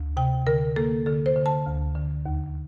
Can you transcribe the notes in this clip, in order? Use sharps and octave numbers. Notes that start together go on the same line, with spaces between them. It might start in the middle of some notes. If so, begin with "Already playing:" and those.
Already playing: D2
C3 G5
D3 A#4
A#3 A4
D3 A4
C5
D3
A5
D2
D3
D#2